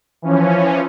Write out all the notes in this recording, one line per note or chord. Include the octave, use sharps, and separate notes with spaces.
E3 F3 C#4